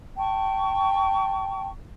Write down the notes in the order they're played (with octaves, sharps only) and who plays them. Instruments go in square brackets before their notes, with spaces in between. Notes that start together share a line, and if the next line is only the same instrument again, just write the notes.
[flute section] G5 A5 C#6